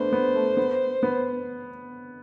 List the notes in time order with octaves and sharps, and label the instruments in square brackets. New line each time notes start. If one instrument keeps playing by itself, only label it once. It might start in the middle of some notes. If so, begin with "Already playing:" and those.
Already playing: [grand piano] A3 B3 D4 [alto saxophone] C5
[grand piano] B3
A3
B3
B3